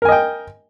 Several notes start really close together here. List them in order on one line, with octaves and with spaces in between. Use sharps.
A#4 G#5 D#5 G5